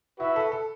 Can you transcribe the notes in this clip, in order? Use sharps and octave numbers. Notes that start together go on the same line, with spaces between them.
E4 F#4 B4 E5
A4
A4